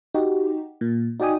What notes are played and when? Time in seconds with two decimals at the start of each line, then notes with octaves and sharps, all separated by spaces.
0.14 D#4 F#4 G4
0.81 A#2
1.20 D#4 F#4 D5 G5 G#5 D#6